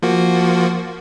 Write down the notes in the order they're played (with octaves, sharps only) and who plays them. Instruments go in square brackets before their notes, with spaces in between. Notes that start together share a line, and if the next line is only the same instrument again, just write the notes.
[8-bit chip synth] F3 A#3 F#4